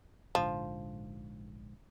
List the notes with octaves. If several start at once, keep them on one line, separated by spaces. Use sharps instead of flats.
A#1 G#2 D3 F3